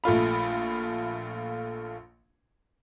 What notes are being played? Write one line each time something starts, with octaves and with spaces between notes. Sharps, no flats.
A#1 A3 F4 B5